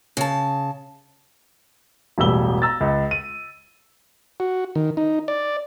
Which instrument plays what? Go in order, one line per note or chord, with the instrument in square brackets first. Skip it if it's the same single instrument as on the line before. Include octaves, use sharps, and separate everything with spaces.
[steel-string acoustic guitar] C#3 A5
[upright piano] E1 A1 G3 E6 G7
A#5 E6 A6
C#2
D#7
[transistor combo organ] F#4
D#3
D#4
D5